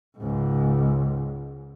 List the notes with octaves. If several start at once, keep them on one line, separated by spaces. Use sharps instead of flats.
C#2 G#2